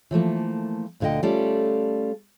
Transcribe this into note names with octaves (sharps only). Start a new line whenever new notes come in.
E3 F3 A3 A#3
D2 A#2 D3 A3 D#5 G5
G3 A3 C#4 F4 A4 D5